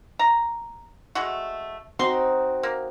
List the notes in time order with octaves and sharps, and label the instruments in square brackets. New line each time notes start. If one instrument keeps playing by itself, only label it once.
[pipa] A#5
G#3 A3 F#4
[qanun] C4 D#4 F#4 [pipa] C6
[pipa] A#3